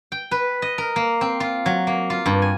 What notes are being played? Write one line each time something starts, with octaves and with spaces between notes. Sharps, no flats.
G5
B4
D#5
A#4
A#3
C4
F4
F#3
A#3
F4
G2
G#5